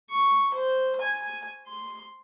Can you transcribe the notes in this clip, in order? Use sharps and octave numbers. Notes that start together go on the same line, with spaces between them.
C#6
C5
G#5
C6